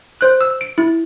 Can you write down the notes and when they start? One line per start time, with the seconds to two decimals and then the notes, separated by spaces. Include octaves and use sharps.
0.21 C5 F#6
0.41 E6
0.61 D7
0.78 E4